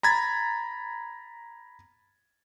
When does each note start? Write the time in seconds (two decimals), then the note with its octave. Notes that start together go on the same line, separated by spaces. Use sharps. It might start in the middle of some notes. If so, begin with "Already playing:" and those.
0.03 A#5 B5 G#6 A6